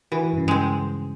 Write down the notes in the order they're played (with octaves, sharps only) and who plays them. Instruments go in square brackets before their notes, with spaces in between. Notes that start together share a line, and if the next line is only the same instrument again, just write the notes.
[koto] E3 [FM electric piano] F#4
[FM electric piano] G2 C#3
[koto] G#3 C4